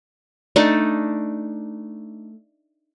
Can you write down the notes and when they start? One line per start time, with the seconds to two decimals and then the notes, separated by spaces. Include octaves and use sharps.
0.56 A3 D4 D#4 A4